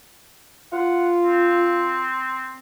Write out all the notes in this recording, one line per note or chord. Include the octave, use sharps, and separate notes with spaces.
F4 F#5
C4